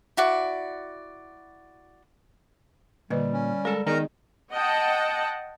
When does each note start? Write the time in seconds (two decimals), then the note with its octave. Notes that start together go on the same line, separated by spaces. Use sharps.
0.17 E4 F#4 D5
3.10 A#2 D3 G3 B4 D#5
3.33 C#4
3.65 G#3 A4 A#4
3.87 D#3 B3 D#4 G#4 A#4 D5 D#5 A#5
4.52 D#5 F#5 G5 A5